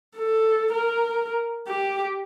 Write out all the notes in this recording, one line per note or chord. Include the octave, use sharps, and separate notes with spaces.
A4
A#4
G4